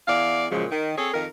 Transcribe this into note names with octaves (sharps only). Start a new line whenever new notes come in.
E2 D5 F5
F#2 A#2 C#3 F3 G#3
D#3
C4 G#4 A4 C#5
F2 D#3 A#4